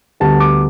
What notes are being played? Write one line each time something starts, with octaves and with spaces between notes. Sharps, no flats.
D2 D3 G3 B3 A5
D6